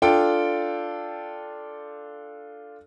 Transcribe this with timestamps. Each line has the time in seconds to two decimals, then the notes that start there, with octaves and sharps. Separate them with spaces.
0.02 D4 F4 A4 G5